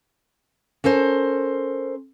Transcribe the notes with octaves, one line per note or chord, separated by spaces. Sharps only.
C#4 A4 A#4 C5